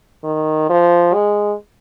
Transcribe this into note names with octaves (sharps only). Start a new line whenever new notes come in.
D#3
F3
G#3